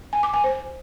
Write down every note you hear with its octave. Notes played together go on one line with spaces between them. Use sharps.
G#5
D6
G#5
C5